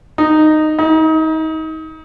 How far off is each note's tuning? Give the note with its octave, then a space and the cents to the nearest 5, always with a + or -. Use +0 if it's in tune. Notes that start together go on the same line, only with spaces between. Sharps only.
D#4 -10
D#4 +30